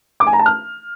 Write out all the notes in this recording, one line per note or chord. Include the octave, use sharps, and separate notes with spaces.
D6
G#5
A#5
A5
F6